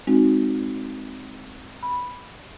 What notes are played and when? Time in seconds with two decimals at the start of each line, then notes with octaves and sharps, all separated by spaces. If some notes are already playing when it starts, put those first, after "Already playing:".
0.07 G#3 C4 D#4 F#4
1.83 B5